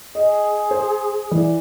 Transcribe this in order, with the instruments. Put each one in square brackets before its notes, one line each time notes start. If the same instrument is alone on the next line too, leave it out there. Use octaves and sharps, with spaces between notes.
[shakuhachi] G#4 [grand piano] D#5
[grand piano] C5
E3 D5